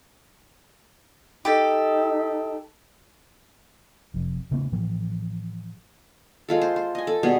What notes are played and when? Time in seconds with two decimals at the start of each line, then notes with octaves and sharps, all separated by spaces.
1.45 D#4 G4 A4
4.14 F1 F2
4.51 C#3 A3 B3 C#4
4.72 A2 E3 F3
6.48 G#3 F4 A4
6.61 C5
6.76 C5
6.95 D#5 G#5
7.07 A4
7.23 B2 G3 B3 G#4